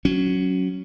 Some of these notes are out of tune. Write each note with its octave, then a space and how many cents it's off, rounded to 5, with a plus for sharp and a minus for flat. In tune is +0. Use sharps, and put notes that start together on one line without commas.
F#3 +0 C#4 +0